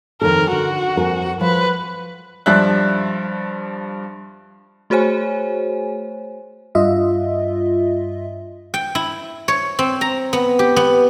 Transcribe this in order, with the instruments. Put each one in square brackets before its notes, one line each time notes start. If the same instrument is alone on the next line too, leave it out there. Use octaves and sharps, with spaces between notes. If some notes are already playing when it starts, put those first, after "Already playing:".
[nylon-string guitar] F2 D#3 A4 [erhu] A#4
[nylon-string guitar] D3 [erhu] F#4
[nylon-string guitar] F2 A#4 G#5
[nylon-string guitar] F3 [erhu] B4
[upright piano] G2 F3 D4 E5 F#6
[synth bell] A3 F#4 G#4 C5 C#5 G#5
[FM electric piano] G2 F4 D#5 E5
[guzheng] G5
E4
C#5
C4
A#5
B3
G4
B3